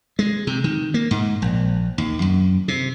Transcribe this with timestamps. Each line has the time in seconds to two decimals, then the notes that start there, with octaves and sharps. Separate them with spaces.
0.19 G#3
0.47 C3
0.64 D#3
0.94 A#3
1.11 G#2
1.42 A#1
1.98 D#2
2.22 F#2
2.68 C3